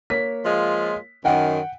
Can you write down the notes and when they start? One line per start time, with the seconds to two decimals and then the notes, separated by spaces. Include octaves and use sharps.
0.10 A#3 C#5 B6
0.45 F3 G#3 F4
1.25 F#2 D#3 F#5 G5